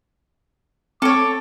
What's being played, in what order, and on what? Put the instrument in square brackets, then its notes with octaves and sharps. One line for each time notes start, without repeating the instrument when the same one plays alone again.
[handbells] C4 [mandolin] A4 C#5 [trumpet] D6